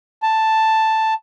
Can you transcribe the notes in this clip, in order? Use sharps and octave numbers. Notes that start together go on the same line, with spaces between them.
A5